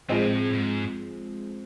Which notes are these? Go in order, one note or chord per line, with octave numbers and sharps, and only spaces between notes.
A2 F3 G#3 C4
A2
G#2